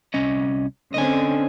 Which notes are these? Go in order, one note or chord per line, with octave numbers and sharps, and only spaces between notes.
C2 C#4 D#5
D3 C4 C#4 D#5 G#5